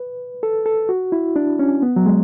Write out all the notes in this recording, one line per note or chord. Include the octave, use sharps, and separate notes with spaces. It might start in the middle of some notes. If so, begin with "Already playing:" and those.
Already playing: B4
A4
A4
F#4
E4
D4
C#4
B3
F#3
G#3